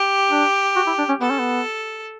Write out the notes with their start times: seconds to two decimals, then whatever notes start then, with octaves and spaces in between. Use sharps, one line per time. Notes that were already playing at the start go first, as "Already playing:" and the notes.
Already playing: G4
0.31 D4
0.76 F#4
0.87 E4
0.99 D4
1.09 C#4
1.21 B3 A4
1.31 C#4
1.39 B3